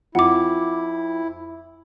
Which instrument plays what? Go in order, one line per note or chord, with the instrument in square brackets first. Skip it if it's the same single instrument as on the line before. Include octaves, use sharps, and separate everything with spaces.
[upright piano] F2 [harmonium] E4 [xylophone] F#5 D6